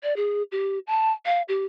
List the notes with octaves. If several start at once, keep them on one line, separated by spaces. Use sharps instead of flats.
D5
G#4
G4
A5
F5
G4